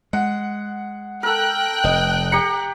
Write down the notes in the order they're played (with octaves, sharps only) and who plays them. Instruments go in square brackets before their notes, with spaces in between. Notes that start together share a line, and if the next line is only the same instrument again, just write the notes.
[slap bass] G#3 [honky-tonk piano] F#5
[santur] A4 A#4 [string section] G5 F#6
[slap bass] F1 [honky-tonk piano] D#5
[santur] G4 A#5 [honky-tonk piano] C#7